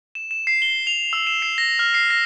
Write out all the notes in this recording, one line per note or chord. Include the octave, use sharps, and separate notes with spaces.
E7
E7
C7
G7
F7
E6
E7
C7
A#6
F6
C7
A#6